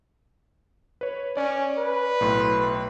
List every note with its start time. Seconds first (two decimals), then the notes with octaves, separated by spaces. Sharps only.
1.01 B4 C#5
1.37 C#4 D5
1.78 B4
2.20 B1 A2 C6